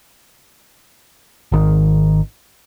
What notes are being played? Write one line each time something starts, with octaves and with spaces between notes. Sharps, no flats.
G#1 D#3